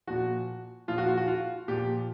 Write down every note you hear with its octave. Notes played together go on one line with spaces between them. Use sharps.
A#2 F3 F#4
A#2 F3 F4
F#4
F4
F#4
F4
A#2 F3 G4